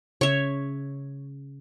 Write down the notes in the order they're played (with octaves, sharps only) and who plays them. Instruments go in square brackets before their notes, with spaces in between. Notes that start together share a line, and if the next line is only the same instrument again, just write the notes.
[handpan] C#3 [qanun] C#5 E5